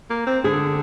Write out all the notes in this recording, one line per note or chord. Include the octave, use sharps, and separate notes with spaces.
A#3
C4
D3 G#4